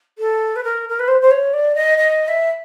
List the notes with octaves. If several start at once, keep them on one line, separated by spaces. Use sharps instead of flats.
A4
B4
A#4
A#4
B4
C5
C5
C#5
D5
D#5
D#5
E5